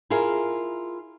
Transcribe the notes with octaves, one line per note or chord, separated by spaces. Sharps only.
E4 F4 G#4 A#4